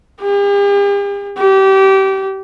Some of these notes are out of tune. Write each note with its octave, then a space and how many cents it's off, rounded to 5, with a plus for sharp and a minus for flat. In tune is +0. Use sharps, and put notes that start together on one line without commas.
G4 +45
G4 -25